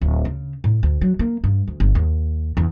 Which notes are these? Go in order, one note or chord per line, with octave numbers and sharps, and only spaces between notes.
D1
C#3
A2
D2
F#3
A#3
G2
D2
G1
D#2
E2